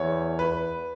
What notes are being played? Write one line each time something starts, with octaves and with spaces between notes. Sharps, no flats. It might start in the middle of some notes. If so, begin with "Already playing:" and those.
Already playing: E2 C#5
B4